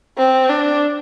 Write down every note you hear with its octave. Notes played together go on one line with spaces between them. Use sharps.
C4
D4